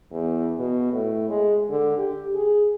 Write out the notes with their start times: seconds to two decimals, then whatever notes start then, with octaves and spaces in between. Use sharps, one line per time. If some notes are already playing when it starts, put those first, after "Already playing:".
0.12 E2
0.59 B2
0.92 A2
1.29 G#3
1.69 D3
1.98 G4
2.35 G#4